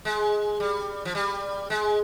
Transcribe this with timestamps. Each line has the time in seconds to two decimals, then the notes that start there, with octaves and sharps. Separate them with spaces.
0.05 G#3
0.60 G3
1.05 F3
1.15 G3
1.70 G#3